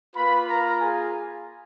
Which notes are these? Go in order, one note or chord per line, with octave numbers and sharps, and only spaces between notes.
A#3 F4 B4 B5
A#4 A#5
G#4 G#5